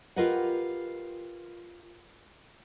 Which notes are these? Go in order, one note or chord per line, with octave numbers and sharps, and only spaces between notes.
F4 G4 A#4 B4 D#5 F#5